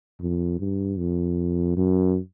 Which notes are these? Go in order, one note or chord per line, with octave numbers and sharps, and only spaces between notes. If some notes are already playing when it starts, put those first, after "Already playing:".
F2
G2
F2
F#2